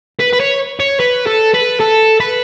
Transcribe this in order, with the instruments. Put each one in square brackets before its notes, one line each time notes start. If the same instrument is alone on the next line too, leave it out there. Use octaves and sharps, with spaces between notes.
[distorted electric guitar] B4
B4
C#5
C#5
B4
A4
B4
A4
B4